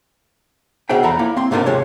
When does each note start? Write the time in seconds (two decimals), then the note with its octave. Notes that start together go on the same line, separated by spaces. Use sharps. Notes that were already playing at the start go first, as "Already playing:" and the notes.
0.89 D2 B2 G#4 C5 E5 G5
1.03 E2 F3 A4 E5 A#5 B5
1.19 A#3 E4
1.37 C4 C6
1.51 G#2 C3 A3 A#3 D4 F4
1.66 D#2 C3 G#3 C#5